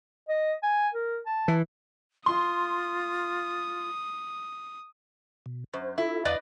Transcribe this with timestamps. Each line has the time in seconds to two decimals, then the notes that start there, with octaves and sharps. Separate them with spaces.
0.29 D#5
0.63 G#5
0.94 A#4
1.26 A5
1.48 E3
2.26 F4 C6 D#6
5.46 B2
5.74 F#2 C5
5.98 E4 F4 A4 E5
6.25 E2 B4 D5 D#5 F5